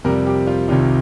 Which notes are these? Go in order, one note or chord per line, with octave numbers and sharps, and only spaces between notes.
F2 C3 G3 A#4
G4
F4
C2 C3 D#3 G3 F4